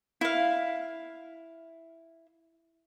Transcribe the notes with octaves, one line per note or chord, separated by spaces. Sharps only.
E4 F5